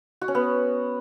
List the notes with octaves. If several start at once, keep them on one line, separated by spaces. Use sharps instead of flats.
F#4
C#4
B3